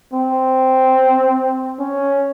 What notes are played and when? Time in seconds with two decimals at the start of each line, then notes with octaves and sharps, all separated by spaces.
0.13 C4
1.79 C#4